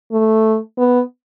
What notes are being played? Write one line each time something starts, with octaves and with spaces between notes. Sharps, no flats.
A3
B3